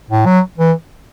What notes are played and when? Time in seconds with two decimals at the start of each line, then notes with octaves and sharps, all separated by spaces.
0.10 A2
0.26 F#3
0.58 E3